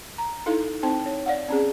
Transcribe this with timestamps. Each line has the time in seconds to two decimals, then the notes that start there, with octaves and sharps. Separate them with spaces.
0.18 A#5
0.46 D#4 E4 A4 F5
0.83 C4 D#4 C5 G5
1.06 C#5
1.26 D5 F5 F#5
1.49 C4 C#4 G#4